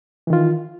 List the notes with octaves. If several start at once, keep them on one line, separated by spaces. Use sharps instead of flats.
D#3 E3 F4